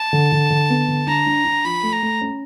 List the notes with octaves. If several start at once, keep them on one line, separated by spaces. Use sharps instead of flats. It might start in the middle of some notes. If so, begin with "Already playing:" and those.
Already playing: A5
D3
D3
D3
B3
D3
D4 A#5
D4
D4
F3 B5
A3
A#5
A3
C#4